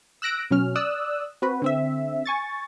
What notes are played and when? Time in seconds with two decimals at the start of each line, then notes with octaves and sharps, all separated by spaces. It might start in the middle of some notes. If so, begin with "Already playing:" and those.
0.22 E6 F#6 A#6 D7
0.51 B2 F#3 C#4 F6
0.75 D5 D#6 E6 F#6
1.42 C4 F#4 B4
1.62 D3 C4 E5
2.26 G#5 C#6 A6